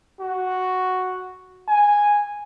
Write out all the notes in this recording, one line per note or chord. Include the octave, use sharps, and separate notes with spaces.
F#4
G#5